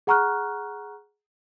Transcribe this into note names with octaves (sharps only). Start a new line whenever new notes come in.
G#4 F#5 A#5 C#6 F6 F#6